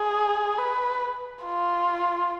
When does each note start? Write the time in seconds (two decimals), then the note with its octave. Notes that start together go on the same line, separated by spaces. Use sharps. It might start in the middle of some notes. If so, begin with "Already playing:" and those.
Already playing: G#4
0.59 B4
1.43 F4